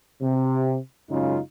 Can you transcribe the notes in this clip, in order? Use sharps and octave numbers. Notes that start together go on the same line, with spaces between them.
C3
F#2 C#3 G#3 D#4 F4